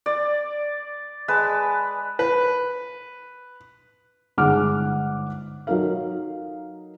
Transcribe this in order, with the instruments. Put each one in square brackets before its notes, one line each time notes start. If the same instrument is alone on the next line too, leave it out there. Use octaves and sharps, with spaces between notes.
[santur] D5
G#3 B4 A5
[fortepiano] B4
[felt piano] G1 G#2 G#4 F#5 D6 F6
F#3 D#4 A4 A#4 F5